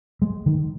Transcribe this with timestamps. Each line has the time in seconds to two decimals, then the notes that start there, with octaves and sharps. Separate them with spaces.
0.22 G#3
0.46 D#3